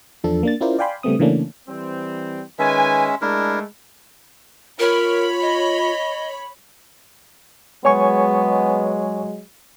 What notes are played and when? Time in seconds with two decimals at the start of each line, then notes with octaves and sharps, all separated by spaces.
0.24 E2 F3 D4 A4
0.43 A#3 D4 A6
0.61 C#4 E4 F4 A#4 C5 D5
0.79 D5 F5 G5 G#5 B5 C6
1.03 C#3 G3 A3 B3 C4 D#6
1.19 C#3 E3 A3 A#3 C#4 D4
1.67 E3 G3 C4
2.59 D#3 G#3 C#4 B4 E5 G#5
3.21 G#3 A3 D4 E4 A#4
4.79 F4 A#4 C#5 B5
5.42 D#5
7.85 F#3 G#3 B3 C#5 G#5 C#6